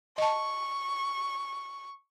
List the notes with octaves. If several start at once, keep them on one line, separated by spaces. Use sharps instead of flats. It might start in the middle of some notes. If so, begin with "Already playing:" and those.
D#5 A5 C#6